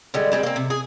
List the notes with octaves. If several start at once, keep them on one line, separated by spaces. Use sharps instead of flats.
D3 G3 G#3
G3 G#3 C4
A#3 C4
C3
G#4